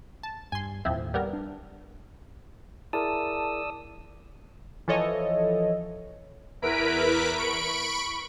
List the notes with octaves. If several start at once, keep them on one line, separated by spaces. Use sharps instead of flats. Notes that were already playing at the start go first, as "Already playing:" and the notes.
A5
G2 G#5 C6
D1 D#2 A2 F3 C4 E4
G3 B3 A#4
D4
E4 G#4 A#4 D5 A5 D#6 E6
E3 F3 A4 C#5 D#5
E2 E4 A#4 B4 B6 D7
B5 C#6 D7